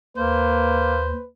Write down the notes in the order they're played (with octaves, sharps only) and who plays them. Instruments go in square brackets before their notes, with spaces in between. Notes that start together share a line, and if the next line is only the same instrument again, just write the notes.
[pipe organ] D#2 [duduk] A#3 [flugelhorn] B4 [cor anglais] C5